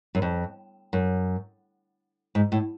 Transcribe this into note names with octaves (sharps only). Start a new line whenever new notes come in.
F#2
F2
F#2
G#2
A2